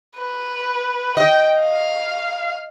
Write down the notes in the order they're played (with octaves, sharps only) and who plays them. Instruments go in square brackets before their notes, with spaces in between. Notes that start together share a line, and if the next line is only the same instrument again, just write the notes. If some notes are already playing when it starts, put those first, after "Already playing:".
[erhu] B4
[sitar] D#5 [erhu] G5
[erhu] F5